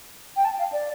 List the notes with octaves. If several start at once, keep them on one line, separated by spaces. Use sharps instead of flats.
G5
A5
F5
D5